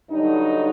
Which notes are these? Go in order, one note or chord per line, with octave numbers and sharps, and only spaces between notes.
G2 D3 F#3 D#4